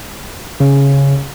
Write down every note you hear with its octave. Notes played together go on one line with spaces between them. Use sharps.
C#3